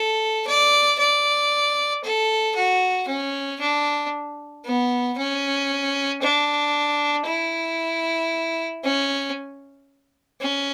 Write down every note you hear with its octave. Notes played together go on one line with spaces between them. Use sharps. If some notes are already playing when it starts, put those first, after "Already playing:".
Already playing: A4
D5
D5
A4
F#4
C#4
D4
B3
C#4
D4
E4
C#4
C#4